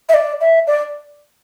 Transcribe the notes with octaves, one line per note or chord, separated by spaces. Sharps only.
E5
D5
E5
D5